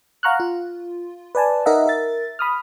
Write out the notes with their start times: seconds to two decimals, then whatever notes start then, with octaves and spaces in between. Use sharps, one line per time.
0.23 F5 F#5 A#5 C#6 F6 F#6
0.40 F4
1.35 B4 D5 G#5 A5
1.66 D#4 A#4 D#5 E5 F#5
1.86 A#4 E5 A6
2.39 B5 D#6 F6